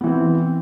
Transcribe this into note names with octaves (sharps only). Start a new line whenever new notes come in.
E3 B3 C4